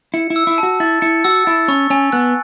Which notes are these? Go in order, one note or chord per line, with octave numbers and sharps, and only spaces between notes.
E4 C#7
E4
E6
E4
F#4 A5
E4 A6
E4 C#7
F#4 E6
E4 A6
C#4 C#6
C#4 G#5
B3 F#6